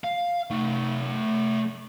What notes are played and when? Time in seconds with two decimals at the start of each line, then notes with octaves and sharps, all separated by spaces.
0.04 F5
0.51 A3 D#4